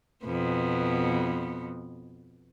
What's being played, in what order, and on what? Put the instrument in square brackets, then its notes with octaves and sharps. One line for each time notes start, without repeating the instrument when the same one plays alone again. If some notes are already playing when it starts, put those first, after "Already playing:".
[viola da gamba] F2 B2 B3